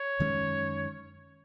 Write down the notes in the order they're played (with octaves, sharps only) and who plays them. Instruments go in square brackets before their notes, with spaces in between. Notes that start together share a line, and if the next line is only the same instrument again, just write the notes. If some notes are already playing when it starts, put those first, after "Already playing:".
Already playing: [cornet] C#5
[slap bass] F#2 D#3 G#3 C#4